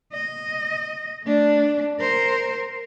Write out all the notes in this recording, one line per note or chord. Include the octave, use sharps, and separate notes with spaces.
D#5
A3 D4
A#4 C5